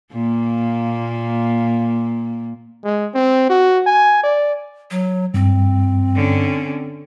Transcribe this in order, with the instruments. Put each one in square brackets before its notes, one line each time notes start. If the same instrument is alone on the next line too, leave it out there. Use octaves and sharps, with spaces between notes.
[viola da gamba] A#2 A#3
[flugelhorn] G#3
C4
F#4
G#5
D5
[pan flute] F#3
[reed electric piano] G2 [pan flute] C4
[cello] D3 C#4